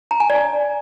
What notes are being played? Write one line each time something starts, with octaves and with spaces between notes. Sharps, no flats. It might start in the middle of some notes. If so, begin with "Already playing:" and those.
A#5
G#5
D5